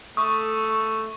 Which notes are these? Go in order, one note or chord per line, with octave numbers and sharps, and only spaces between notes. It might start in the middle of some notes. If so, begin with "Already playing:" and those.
A3 C#6 D#6